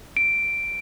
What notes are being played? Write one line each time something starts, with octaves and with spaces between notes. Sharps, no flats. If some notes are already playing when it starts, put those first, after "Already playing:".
D7